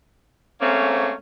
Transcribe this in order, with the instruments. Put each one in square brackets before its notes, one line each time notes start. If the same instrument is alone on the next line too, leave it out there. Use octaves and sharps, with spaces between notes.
[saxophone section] G#2 A3 A#3 C4 C#4